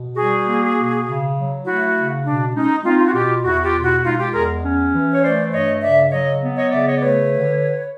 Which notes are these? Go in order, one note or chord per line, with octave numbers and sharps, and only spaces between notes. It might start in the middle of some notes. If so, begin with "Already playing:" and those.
Already playing: B2
G3 F#4 G#4
A#3
B2
C#3
F#3
A3 E4 F#4
C#3
B2 D4
G#3 C#4 D#4
C4 D#4 F4
F4
F#4
B2 F4 G4
E2 E4 F#4
F4 G4
B2
E4 F#4
G#3 D#4 F4
F4 G4
E2 G#4 A#4
C#4
E3
C#5
A3 C5 D5
G2 C#5 D#5
C#3 D5 E5
F#3 C#5 D#5
B3
C#5 D#5
C#3 D5 E5
C#5 D#5
D5
A3 B4 C#5
D3